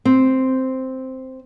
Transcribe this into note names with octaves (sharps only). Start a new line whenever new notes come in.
C4